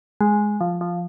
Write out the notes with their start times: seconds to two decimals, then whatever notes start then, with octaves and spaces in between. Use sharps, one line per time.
0.21 G#3
0.61 F3
0.81 F3